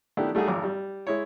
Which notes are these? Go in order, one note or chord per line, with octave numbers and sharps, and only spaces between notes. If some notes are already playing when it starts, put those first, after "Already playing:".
D#3 A3 B3 D4 E4 G4
G3 A3 D#4 F#4 G#4
G#1 F2 D6
G3
G#3 E4 C#5